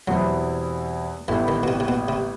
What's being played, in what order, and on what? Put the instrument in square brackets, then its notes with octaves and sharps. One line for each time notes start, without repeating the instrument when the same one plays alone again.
[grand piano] E2 B2 G3 C4 E4 [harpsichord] F#3
[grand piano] A1 A2 G3 B3 E4 [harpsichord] E3
[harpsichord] D#3
B2
C3
C3
B2
C3